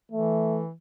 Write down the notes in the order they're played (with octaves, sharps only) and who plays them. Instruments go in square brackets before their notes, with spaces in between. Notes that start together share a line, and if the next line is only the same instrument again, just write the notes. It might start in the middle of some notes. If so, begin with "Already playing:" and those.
[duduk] E3 [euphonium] A3